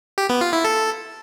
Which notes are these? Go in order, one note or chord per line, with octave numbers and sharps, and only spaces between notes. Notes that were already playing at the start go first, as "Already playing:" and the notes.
G4
B3
F4
E4
A4